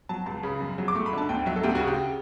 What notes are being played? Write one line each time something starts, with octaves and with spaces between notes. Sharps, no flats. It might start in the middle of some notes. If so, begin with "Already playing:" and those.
F#3 A5
C#2 A5
C#3 B5
F#2
F#3
D6
A3 C#6
B5
D3 A5
D2 G5
F#3 E5
A4
D2 G4
F#4
C#3
G4